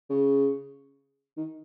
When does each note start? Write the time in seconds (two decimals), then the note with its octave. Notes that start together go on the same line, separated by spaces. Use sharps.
0.10 C#3
1.37 D#3